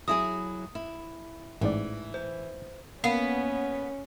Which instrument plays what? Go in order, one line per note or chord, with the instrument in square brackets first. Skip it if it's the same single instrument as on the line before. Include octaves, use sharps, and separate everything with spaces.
[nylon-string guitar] F#3 E4 G#4 [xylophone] D#6
[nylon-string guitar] E4
[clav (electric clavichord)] A1 G#2 D5 [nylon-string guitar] E3
[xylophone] C5
[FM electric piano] A#3 [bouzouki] B3 [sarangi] C#4 [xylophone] F5